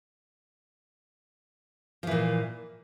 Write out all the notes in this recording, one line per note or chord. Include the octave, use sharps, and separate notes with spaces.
A#2 E3 F3